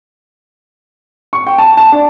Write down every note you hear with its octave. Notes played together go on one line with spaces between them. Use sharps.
C#6
G5
A5
A5
D4